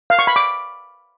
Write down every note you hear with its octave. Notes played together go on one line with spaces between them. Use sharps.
F5
C#6
B5
D6